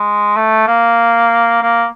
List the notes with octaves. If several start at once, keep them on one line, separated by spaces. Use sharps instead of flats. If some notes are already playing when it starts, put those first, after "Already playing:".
Already playing: G#3
A3
A#3
A#3